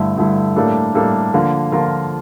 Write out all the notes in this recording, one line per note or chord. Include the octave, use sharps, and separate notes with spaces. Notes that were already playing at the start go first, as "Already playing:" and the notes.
Already playing: G2 D3 A3 E4
G2 D3 A3 E4
A2 G3 A#3 D4 A4
A2 G3 A#3 D4 A4
D3 F3 A#3 F4 A#4
D3 F3 A#3 F4 A#4